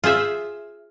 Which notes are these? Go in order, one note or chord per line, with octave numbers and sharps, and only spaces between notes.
F4 G#4 C5 E5